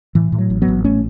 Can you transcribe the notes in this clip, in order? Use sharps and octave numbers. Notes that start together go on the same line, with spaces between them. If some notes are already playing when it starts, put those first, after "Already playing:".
A2 E3
A2
F#3
A1
F#3 B3
A1
A2 A3 C#4